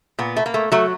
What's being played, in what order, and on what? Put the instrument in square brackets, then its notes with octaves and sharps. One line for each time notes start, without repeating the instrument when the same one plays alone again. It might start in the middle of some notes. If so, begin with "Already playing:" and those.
[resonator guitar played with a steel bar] A#2 B3
A3
A#3
A3
F#3 A3